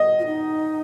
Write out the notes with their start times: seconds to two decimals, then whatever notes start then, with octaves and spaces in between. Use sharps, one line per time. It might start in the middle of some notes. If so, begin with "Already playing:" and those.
Already playing: D#5
0.19 F4
0.26 D#4